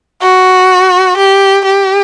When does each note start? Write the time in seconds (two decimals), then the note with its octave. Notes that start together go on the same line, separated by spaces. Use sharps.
0.22 F#4
1.17 G4
1.65 G4